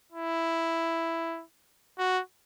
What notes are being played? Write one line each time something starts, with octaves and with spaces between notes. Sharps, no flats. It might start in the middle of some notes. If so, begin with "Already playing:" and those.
E4
F#4